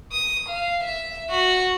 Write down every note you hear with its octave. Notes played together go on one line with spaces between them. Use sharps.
D#6
F5
E5
F#4